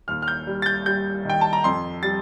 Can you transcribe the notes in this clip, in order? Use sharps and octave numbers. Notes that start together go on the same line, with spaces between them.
D#2 F6
F6
G6
G3
A6
G6
G3 G6
D#3 G5
A5
A#5
F2 C6
G3 A6